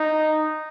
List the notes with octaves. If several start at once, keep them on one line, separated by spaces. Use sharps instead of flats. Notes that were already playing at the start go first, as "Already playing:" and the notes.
Already playing: D#4